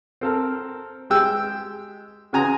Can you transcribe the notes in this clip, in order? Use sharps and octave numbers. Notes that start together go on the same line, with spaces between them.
C4 A4 A#4
G#3 G4 G5 E6
C#3 F#4 G#5 A#5 C6 D#6